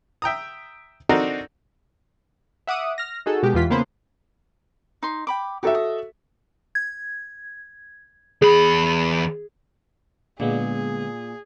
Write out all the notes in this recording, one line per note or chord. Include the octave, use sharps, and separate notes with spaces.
E5 G5 A#5 D#6
C4 D4 D#4 F#4 A4 A#4
E5 F#5 D6 D#6
F6 A#6
D#4 F#4 G#4 A4
B2 G#3 G4
E2 E3 F4 B6
C#3 A#3 B3 B4 C5
D#4 C6
G5 B5 D6
D#4 F#4 G4 A4 E5
D#5
G#6
E2 G#4 B5
A#2 D3 G#3 B3 G#4